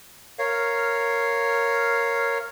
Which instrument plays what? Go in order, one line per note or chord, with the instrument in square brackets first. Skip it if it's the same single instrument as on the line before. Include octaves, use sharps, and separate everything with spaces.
[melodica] A#4 C#5 F5